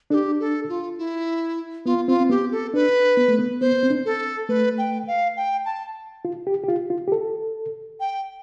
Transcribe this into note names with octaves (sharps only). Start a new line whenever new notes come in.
D4 G4 A4
A4
F4
E4
B3 F4
C4 F4
C4
B3 G4
A4
D4 B4
B3
A3
B3
B3 C5
C4
D4
A4
A3 B4
G5
F5
G5
A5
F4
G4
G4
F4
F4
G4
A4
G5